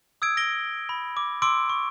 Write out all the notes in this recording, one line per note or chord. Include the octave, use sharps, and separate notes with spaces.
D#6 E6 G#6 D7
A#6 D7 G7
B5
D6
C6 D6 E6 D7
C#6